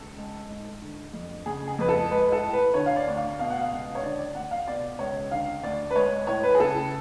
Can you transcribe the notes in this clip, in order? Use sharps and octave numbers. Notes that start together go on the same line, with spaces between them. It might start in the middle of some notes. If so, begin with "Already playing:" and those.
Already playing: C#2 A4
G#3
G#2
D3
F2
C#3 G#4
G#4
F2 B4
A4
G#3 B4
A4
A2
B4
D3 C#5
F5
D5
D2
F5
B2 F5
F#5
F5
C#2
C#5
D3 D5
D5
D2 F#5
F5
B2 D5
C#2 C#5
D3 F5
D2 D5
B4
G#3 C#5
A2 C#5
B4
G#4
C#3 A4